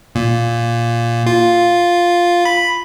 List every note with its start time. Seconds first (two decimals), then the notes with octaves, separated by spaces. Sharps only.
0.15 A#2
1.26 F4
2.45 B5